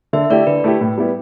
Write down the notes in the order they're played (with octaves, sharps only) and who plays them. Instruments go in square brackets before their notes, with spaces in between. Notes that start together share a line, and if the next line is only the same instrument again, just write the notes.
[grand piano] D3 [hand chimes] E5
[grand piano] A3 E4 G4 [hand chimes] D5
[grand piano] D3 [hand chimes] B4
[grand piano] A3 E4 G4
A2
G3 B3 E4 G4